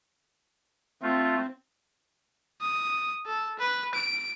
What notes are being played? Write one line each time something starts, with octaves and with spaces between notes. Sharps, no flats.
A3 C4 F4
D#6
A4
B4
D7